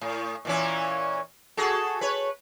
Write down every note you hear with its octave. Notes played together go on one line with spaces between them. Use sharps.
A2
A#2 E3 C#4
F#4 G#4 A4
B4 C#5